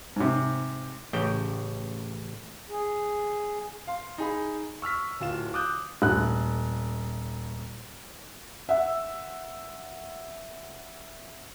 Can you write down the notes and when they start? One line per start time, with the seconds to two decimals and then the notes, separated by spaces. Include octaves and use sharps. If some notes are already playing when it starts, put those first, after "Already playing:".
0.16 G#2 C3
1.13 A1 C#3 G5
2.69 G#4
3.87 F5 C6
4.18 D#4 G#4 B5
4.82 C#6 E6 F6 B6
5.20 D1 F4 E7
5.54 D6 D#6 F#6 G6
6.02 D#1 A3 F#6
8.69 E5 F#5 E6